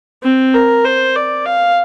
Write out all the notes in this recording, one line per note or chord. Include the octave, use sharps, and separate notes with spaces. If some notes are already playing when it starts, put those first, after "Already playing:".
C4
A#4
C5
D5
F5